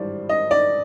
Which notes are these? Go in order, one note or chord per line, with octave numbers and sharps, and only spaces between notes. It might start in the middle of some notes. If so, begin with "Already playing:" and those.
Already playing: G#1 G2 E3 G3 C5 D5
D#5
D5